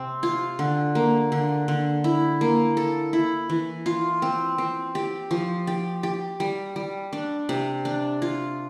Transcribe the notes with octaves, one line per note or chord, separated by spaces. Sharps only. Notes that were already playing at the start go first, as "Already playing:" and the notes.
Already playing: C3 C4
F4
D3
A#3
D3
D3
E4
A#3
A4
E4
E3
F4
C4
C4
G4
F3
G4
G4
G3
G3
D4
C3
D4
F4